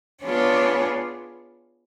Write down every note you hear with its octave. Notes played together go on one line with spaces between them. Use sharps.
B3 D4 F4 G#4 C#5